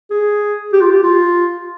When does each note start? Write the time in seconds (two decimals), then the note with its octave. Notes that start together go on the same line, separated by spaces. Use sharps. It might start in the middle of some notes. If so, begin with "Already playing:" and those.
0.11 G#4
0.73 G4
0.81 F4
0.91 G4
1.03 F4